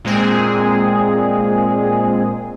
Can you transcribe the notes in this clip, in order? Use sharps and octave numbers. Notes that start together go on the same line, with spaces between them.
A#2 G#3 C4 G#4